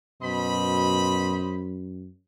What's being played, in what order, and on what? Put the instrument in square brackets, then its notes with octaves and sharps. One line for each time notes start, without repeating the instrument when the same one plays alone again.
[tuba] F#2 [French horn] B2 [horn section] C5 D#5 B5